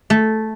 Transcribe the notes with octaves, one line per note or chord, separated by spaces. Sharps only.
A3